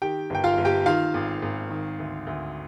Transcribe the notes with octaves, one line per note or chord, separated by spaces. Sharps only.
D#3 G4 G5
G1 G5
F4 F5
G1
G4 G5
D#3 F4 F5
G#1
G#1
D#3
D2
D2